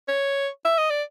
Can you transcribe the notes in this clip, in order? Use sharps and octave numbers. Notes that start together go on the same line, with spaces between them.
C#5
E5
D#5
D5